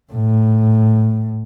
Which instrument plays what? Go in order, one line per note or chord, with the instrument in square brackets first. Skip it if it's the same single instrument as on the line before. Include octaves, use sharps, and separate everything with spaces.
[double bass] A2